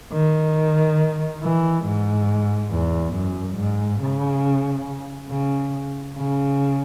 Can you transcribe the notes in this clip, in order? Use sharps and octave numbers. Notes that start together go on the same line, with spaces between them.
D#3
E3
G#2
E2
F#2
G#2
C#3
C#3
C#3